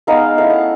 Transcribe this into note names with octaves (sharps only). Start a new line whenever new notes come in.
G#3 B3 D#4 F5
A3 C#4 E4 F5
F#5